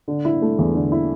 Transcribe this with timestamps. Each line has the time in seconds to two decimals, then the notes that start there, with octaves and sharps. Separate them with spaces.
0.08 D3
0.25 E4
0.42 A3
0.59 E2
0.75 D3
0.92 E4